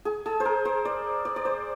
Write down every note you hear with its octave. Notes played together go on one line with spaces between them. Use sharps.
G#4
G#4
C5
A#4
C5
D5
D5
D5
C5